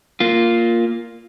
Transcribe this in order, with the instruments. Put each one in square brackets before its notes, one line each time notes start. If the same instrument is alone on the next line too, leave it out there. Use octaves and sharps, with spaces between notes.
[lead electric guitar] A#3 F4